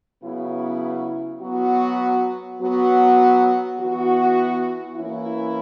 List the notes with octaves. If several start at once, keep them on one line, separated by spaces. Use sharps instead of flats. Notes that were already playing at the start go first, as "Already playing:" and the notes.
C#3 F#3 B3 E4
F#3 B3 F#4
F#3 B3 F#4
E3 B3 F#4
E3 A#3 C#4 E4